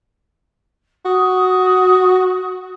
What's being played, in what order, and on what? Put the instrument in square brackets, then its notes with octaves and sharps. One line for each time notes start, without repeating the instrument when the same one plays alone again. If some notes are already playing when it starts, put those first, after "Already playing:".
[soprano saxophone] F#4 [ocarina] D#6